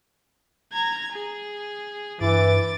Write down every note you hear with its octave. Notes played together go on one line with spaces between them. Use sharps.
A#5 G#6
G#4
G2 E3 D6 A6